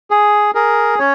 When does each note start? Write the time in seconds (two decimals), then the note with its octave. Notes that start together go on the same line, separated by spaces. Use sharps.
0.11 G#4
0.55 G#4 A#4
0.99 C#4 C#5